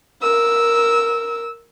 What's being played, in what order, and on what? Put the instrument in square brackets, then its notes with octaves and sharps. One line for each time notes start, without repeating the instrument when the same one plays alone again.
[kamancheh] A#4 E6